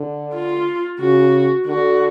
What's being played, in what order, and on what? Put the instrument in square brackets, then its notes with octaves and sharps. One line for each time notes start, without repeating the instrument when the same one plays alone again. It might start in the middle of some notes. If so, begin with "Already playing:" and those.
Already playing: [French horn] D3
[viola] F4
[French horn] C#3 [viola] F#4
[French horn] D3 [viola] F#4